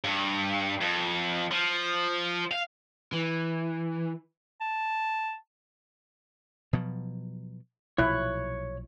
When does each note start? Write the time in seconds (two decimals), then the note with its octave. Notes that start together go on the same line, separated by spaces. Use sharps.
0.04 G2
0.81 F2
1.51 F3
2.51 F5
3.13 E3
4.61 A5
6.73 B2 F3 F#3
7.98 B1 A#2 F3 E4 C#5 F#6